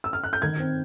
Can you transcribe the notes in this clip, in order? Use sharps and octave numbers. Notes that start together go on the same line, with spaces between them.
E6
F6
F#6
G6
D#3 G#6
C4